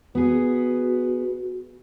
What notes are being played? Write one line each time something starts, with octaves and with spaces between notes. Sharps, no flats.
B3 F#4 G#4